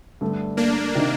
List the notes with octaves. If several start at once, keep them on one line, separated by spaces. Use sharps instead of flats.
G2 D3 A3
A#3 D4
C3 D#3 A#3 D#4